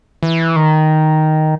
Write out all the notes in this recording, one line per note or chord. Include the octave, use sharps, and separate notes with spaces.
E3
D#3